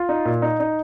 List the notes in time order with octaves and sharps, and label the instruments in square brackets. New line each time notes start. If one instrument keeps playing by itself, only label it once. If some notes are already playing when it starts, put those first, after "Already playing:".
Already playing: [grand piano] F4
D#4
A#2
D#4
D#4